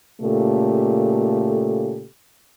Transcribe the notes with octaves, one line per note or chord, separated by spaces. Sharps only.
A#2 C#3 A3 G4 A4